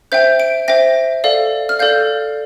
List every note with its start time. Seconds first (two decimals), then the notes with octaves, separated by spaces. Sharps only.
0.12 C5 E5 G5 G6
0.40 D7
0.68 C5 E5 G5 A#6
1.24 A4 D5 F5
1.69 F6
1.79 A4 D5 F5 G6